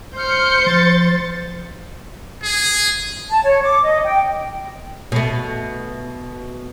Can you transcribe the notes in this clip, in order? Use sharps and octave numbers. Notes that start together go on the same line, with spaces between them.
C5 F6 G6 C#7
F3 A6
G#4
A5
C#5
D6
D#5
G5
B2 A3